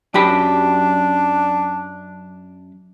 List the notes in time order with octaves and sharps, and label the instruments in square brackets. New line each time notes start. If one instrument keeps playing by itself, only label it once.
[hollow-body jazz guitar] F#2 G4 B5 [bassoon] D4